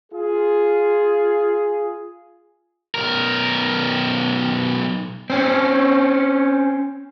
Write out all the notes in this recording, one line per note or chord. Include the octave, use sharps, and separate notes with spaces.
F4 G#4
B1 A#4
C4 C#4